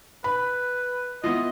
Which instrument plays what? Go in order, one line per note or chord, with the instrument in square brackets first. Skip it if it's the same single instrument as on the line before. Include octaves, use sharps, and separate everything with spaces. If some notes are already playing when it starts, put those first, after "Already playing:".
[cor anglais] B4 [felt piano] B5
[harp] B3 E4 F4 [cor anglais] D#5